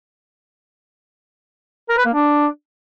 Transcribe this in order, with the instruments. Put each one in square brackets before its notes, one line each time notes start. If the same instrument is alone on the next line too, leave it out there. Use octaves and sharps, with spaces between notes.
[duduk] A#4
B4
A#3
D4